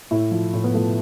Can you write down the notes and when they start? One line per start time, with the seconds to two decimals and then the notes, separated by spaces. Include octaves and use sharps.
0.11 A2 E4
0.32 F3
0.53 A2
0.64 B3
0.74 F3 A3